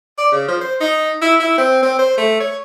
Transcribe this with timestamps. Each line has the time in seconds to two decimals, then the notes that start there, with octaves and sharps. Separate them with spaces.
0.18 D5
0.32 C#3
0.48 F3
0.61 C5
0.80 D#4
1.22 E4
1.40 E4
1.58 C4
1.82 C4
1.99 C5
2.18 A3
2.40 C#5